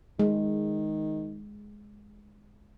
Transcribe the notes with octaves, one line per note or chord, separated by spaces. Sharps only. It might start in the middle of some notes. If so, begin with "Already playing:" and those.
D#3 G#3